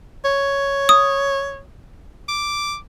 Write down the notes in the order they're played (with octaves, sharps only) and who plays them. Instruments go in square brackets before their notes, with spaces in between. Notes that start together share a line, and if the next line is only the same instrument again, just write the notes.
[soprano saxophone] C#5
[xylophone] D#6
[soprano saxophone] D6